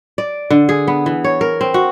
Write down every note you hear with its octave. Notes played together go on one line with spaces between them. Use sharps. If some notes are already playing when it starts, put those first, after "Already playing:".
D5
D3
G#4
B3
E3
C#5
A#4
C4
F#4